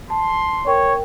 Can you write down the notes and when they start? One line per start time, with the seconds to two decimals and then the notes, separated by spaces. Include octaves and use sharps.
0.10 A5 C6
0.67 A#4 C#5 G5